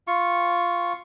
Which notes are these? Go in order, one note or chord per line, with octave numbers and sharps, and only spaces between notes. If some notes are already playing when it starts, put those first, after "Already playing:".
F4 C#6